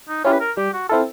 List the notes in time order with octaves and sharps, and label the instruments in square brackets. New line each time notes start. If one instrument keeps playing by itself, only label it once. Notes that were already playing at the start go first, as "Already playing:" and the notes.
[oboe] D#4
[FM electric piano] C#4 E4 G4 [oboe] F4
[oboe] B4
A#4
[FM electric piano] G3 [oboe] G4
[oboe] F#4
[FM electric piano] C4 E4 A4 [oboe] F4